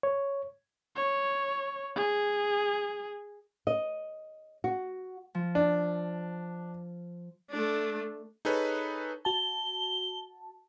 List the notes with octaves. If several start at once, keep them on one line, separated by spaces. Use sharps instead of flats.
C#5
C#5
G#4
D#5
F#4
F3
D4
A3 D4
D#4 G#4 A4 B4 C#5
F#4 A5 G7